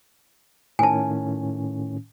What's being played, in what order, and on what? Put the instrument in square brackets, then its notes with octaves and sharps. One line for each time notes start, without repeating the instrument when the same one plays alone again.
[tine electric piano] A2 D#3 C#4 [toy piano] G#5 A5